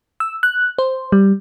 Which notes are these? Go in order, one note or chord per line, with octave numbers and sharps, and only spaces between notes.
E6
F#6
C5
G3